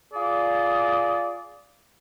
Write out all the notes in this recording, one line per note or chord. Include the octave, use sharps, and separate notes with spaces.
F4 G#4 D5